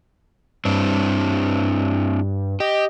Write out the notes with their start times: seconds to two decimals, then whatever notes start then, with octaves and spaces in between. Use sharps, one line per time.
0.65 G2 C4 D4 E4
2.60 G4 D#5